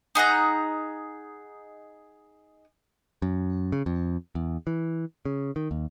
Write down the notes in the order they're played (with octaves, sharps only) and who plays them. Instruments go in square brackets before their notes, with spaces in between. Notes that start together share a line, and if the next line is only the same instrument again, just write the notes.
[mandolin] D#4 G#4 F#5 A#5
[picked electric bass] F#2
C#3
F2
E2
E3
C#3
D#3
D#2